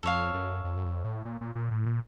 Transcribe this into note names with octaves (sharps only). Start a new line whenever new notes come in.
F2 A4 C#5 F5
F#2
F2
F#2
F2
A2
A#2
A#2
A#2
A2
A#2